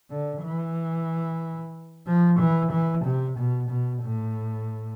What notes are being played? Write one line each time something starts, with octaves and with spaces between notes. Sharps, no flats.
D3
E3
F3
E3
E3
C3
B2
B2
A2